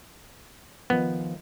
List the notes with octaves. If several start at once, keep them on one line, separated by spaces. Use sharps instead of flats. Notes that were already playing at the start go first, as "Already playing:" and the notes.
D#3 F3 B3 C5